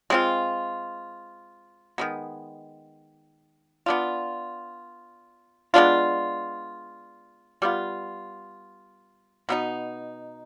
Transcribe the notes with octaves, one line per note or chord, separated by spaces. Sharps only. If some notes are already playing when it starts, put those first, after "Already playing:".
G#3 C4 F4
D#3 G#3 B3
B3 D4 F4
G#3 B3 D4 F4
G3 B3 F4
B2 B3 D#4